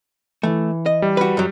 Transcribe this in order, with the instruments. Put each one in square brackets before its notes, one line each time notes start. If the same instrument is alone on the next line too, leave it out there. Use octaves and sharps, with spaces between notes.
[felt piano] E3 [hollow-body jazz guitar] A3
[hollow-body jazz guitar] D#5
[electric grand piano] G3
[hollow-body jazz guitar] F#4 B4
F#2 F#3